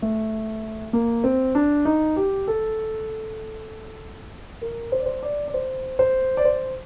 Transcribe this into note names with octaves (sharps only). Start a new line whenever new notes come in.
A3
A#3
C4
D4
D#4
G4
A4
A#4
C5
D5
C5
D5
D5
C5
C5
D5
C5